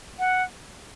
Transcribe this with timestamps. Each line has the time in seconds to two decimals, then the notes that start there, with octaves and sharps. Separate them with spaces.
0.19 F#5